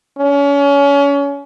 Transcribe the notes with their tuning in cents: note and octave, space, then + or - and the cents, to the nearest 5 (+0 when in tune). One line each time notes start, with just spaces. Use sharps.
C#4 +30